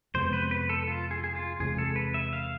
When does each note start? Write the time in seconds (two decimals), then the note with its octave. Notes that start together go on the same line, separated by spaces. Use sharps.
0.14 F2 C3 G#3 B3 C5
0.33 B4
0.51 B4
0.69 A4
0.88 F4
1.11 G#4
1.24 G#4
1.35 F4
1.60 E2 C3 G#3 G#4
1.78 A4
1.96 B4
2.14 E5
2.33 F5